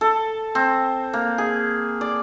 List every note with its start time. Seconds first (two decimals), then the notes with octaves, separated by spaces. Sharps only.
0.01 A4
0.55 C4
1.13 A#3
1.38 G#4
2.01 D5